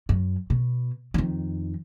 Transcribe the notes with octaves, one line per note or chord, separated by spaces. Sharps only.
F#2
B2
F2 D#3